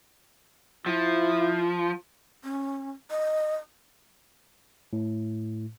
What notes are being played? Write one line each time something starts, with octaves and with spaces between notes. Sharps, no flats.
F3 E4
C#4
D#5
A2